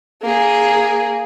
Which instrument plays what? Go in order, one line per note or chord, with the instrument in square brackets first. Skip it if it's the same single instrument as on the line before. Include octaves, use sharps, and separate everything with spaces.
[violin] A#3 G#4